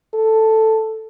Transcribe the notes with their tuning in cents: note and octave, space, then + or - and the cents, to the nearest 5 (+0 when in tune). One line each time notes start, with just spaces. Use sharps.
A4 +5